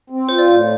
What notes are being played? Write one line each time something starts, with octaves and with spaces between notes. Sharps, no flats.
C4
F4 C5
D5
A2 C5